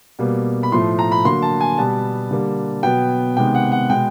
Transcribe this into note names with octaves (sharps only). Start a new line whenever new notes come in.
B2 G3 A#3
B5
A2 F3 A3 C6
A#5
B5
D3 F#3 A#3 C6
A5
G#5
B2 G3 B3 A5
D3 G3 A#3
B2 F#3 B3 G5
C3 D#3 G#3 B3 G5
F#5
F#5
B2 G#3 B3 G5